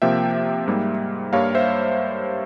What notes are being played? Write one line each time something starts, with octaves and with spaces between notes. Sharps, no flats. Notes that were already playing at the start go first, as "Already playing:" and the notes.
C3 F3 A#3 E5 G5
G#2 G3 A#3
G2 G3 A#3 C#5 F5
C5 E5